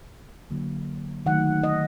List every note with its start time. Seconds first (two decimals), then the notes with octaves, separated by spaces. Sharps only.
0.51 D3 F#3 A#3
1.26 D#3 F#3 A3 F#5
1.63 D#5